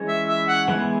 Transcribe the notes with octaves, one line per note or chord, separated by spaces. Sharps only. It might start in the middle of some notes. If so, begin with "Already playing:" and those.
Already playing: E3 G#3 C#4 G#4 C#5
E5
E5
F#5
E3 G#3 B3 E4 G#4